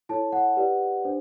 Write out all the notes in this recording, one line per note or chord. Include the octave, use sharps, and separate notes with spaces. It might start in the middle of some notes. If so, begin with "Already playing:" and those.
E4 A4 C#5 A5
F#5
G4 B4 D5
D4 G4 C5